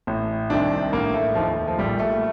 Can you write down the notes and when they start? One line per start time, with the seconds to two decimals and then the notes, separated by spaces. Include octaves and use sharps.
0.07 A1 A2
0.50 C2 C3 D#3 D4
0.92 A1 A2 A#3
1.14 A3
1.35 F1 D#2 D#3 F3
1.67 F3
1.78 A#1 A#2 G3
2.00 A3